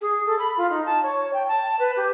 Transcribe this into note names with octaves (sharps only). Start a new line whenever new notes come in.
G#4
A4
B5
F4
D#4
A5
C#5
G5
A5
B4
G4